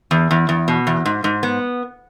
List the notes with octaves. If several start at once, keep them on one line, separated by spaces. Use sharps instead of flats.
E2
E2
E2
B2
E2
G#2
G#2
B3